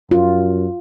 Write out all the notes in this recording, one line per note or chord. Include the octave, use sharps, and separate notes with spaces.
F#2 F4